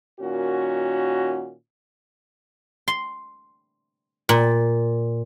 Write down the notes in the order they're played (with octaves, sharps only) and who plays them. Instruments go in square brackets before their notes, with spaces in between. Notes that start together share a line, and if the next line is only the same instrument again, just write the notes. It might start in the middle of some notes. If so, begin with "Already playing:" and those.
[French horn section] A#2 D#3 C#4 F#4
[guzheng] C6
A#2